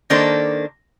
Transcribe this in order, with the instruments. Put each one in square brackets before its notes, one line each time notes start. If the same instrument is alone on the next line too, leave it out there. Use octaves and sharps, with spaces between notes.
[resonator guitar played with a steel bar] D#3 A#3 D4 A4 C5